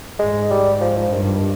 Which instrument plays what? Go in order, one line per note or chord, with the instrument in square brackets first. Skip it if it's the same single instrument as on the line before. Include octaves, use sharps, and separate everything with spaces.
[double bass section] G#2 [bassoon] G#3
[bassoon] G3
F3
F3
[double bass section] G2 [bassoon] D#3